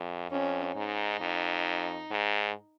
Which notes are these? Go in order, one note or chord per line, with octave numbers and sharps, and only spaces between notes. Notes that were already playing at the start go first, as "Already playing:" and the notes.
Already playing: F2
F2 C#4
G#2 D#4
F2
G#2